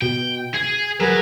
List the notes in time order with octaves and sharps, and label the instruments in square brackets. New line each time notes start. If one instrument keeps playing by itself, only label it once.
[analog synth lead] B2 [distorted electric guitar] G5
[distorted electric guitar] G#4 [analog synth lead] G#6
[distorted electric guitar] F#3 [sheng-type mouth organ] G#4 A#4 B4